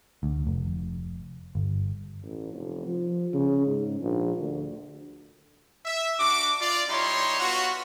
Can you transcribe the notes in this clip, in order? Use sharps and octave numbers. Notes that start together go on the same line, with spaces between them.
D2
F1
G1
A1
F1
F3
C#3
G#2
A#1
D2
E5
D4 F#4 D6
F4 D5
G3 D#4 E4 C#5 C6
B3 F4 F#4